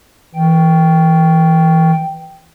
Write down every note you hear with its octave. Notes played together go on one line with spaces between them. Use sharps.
E3 G5